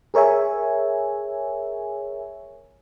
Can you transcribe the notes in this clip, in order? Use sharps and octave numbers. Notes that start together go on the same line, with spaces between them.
G#4 A#4 C#5 E5 G#5